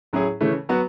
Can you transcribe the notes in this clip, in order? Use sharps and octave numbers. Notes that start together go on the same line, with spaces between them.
A2 F#3 C#4 E4 G#4
C#3 E3 A3 C#4
F#3 B3 F#4